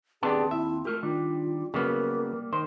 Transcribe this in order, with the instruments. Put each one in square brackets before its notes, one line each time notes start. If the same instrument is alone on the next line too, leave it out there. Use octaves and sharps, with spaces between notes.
[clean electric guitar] D#2 C4 A5 [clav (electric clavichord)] B3 D4 G4 [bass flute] G#4
[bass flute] E4 [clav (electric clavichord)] E5
[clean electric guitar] A3 F4 G4 [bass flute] A#4
[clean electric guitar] D#3 G3 D4 [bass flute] F4
[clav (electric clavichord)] C#3 F#3 B3 [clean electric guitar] G3 A#3 [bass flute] A#4
[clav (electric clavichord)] D#3 [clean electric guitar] C5